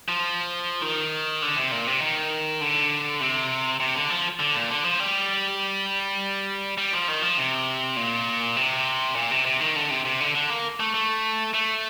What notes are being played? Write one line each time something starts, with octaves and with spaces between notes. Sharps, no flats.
F3
D#3
D3
C3
A#2
C3
D#3
D3
C3
C3
D3
F3
D3
A#2
D3
F3
G3
G3
F3
D#3
F3
C3
A#2
C3
A#2
C3
C3
D#3
D3
C3
C3
D3
D3
A#3
A3
A3
A3